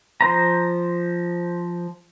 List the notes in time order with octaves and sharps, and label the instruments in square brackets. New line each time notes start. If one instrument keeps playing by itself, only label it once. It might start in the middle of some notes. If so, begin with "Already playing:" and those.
[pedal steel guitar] F3 C5 A#5